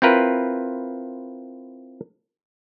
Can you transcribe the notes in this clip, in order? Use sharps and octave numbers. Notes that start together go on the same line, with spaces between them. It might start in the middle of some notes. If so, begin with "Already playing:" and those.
C4 E4 F4 A#4 B4